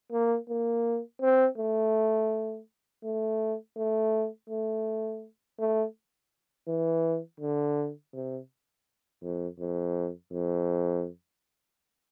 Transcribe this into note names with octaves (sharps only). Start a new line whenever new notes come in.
A#3
A#3
C4
A3
A3
A3
A3
A3
E3
D3
C3
F2
F2
F2